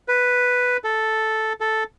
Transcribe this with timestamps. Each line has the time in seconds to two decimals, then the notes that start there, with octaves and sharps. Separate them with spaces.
0.08 B4
0.84 A4
1.61 A4